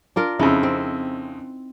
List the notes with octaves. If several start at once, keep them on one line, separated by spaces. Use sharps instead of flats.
D4 F4 A#4
F2 C#3 D#4 E4
C4